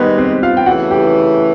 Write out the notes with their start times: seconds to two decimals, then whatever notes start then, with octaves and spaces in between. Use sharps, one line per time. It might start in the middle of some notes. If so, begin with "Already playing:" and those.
Already playing: G#2 D#3 G3 G#3 B3 G4 B4
0.18 C4 C5
0.43 F4 F5
0.57 G5
0.66 C#3 E3 A3 F#4 F#5
0.91 G4 G5